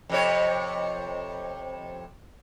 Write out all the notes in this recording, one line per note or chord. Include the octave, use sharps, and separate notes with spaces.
F2 C3 C#5